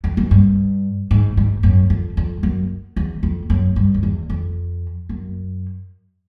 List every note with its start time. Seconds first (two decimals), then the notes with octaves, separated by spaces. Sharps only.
0.04 F2
0.17 F#2
0.31 G2
1.11 G#2
1.37 G#2
1.63 F#2
1.90 F2
2.17 F2
2.43 F#2
2.96 E2
3.23 F2
3.50 F#2
3.76 G2
3.94 F2
4.03 E2
4.30 F2
5.09 F#2